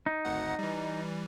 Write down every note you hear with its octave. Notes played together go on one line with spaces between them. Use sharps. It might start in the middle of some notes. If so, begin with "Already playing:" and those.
D#4
G#1 D2 F#5
E3 G3